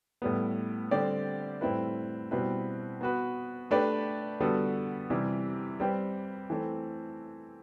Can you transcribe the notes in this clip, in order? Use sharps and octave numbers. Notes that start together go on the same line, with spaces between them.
A2 G3 B3
D3 G3 C4 G4 D5
A2 G3 C4 E4 B4
B2 G3 C4 E4 B4
B3 F#4 B4
A3 D4 G4 B4 D5
D3 G3 B3 F#4 A4
C3 E3 G3
G3 C4 G4 B4
E3 A3 C4